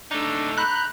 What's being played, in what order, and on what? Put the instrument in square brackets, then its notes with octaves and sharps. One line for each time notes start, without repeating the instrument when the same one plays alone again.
[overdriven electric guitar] A3 D#4 [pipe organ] D4 A#5
[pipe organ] A#5 B5 G6 [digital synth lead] F#6